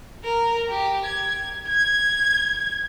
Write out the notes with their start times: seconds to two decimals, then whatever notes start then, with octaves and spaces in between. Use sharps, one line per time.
0.24 A#4
0.69 G4
1.05 G#6
1.68 G#6